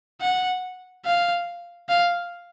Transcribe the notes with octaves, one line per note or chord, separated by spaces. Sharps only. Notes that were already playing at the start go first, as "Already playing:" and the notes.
F#5
F5
F5